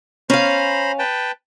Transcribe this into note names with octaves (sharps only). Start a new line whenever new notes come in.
C#4 C5 F5 A#5 B5
B4 G5 A5